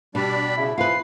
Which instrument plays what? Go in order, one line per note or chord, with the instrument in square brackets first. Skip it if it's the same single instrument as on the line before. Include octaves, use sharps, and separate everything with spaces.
[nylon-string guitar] B2 [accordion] G3 D4 D5 [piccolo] B5
[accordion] C#3 [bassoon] E4
[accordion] E3 F3 [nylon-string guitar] F4 B4 [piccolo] C7